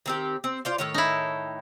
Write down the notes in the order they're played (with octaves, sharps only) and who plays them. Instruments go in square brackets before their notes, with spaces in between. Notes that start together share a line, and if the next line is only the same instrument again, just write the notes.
[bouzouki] D#3 C4 G4
C4
F4 C5 D5
A2 D#3 C#5
[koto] D#4 E4